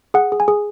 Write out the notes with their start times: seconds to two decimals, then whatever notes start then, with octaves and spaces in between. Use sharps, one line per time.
0.14 G#4 F#5
0.32 G#4
0.40 G#5
0.48 G#4